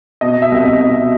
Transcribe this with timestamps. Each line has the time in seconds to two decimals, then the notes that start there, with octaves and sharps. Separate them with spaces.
0.21 B2 D#5
0.37 B2 E5
0.52 C2
0.61 D#5
0.66 C2
0.80 B2 D#5
0.95 B2